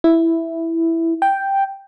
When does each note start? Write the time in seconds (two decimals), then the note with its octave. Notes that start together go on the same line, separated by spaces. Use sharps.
0.04 E4
1.22 G5